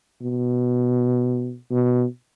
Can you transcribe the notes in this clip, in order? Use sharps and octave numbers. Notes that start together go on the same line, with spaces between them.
B2
B2